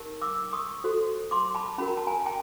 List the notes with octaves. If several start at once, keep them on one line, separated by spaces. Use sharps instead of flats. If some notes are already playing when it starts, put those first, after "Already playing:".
Already playing: D#4 G4 A#4
D6 E6
C#6 D#6
F#4 A4 C5
C6 D6
A5 B5
C#4 F#4 A#4 B5
A#5
A5
G#5 A#5
G5 A5